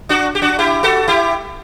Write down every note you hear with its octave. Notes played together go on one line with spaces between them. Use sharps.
D4 F#4
G4
D4 F#4
E4 G4
F#4 A4
E4 G4